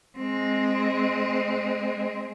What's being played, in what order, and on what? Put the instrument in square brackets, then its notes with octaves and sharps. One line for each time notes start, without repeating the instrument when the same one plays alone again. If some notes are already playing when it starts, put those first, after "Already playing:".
[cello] G#3 C4